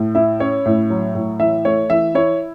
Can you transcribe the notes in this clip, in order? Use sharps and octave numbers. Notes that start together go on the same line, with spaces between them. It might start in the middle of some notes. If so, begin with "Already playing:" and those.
Already playing: A2
E4 E5
C#4 C#5
A2
F#3
A2
E3 E5
A3 C#5
E3 E5
E4 C#5